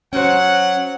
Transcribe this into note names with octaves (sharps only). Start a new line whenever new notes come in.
F#3 C#4 C5 F#5